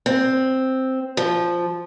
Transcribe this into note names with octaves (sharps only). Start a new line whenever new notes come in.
C4
F3